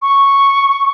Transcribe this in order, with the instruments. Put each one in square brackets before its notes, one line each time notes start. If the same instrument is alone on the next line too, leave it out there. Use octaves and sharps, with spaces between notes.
[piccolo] C#6